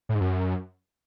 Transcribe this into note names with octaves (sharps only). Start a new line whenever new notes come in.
A2
G#2
F#2